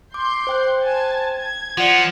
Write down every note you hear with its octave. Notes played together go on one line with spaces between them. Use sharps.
C6 D6 G6
C5 G5 F#6
G#5 A5 G#6
G#6
F3 F4 D5 F#5 C7